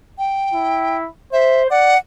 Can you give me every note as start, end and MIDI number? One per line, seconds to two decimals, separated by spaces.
0.18 0.97 79
0.54 1.08 64
1.33 1.68 72
1.33 1.63 76
1.70 1.95 74
1.70 1.97 78